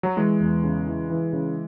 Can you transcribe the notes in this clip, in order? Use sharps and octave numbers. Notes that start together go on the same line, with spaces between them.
F#3
E3 G#3
E2
C#3
E3
E3
C#3